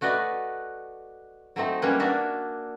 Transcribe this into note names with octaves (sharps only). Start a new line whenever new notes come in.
A3 F#4 B4 D5 D#5
F#3 A3 C4 D#4
G3 A#3 C#4 D#4 G#4 B4
A#3 D4 F#4 D5 E5